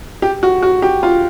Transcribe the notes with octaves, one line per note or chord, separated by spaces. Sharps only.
G4
F#4
F#4
G4
F4